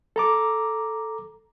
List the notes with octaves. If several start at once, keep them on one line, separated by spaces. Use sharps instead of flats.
A4 A#5 D6